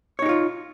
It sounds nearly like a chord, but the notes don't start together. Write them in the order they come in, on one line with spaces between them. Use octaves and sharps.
C#5 D#4 G4 F4